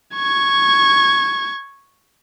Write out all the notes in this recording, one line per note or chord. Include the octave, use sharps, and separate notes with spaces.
C#6 G#6